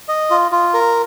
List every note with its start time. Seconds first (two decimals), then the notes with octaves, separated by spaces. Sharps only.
0.08 D#5
0.31 F4
0.51 F4
0.74 A#4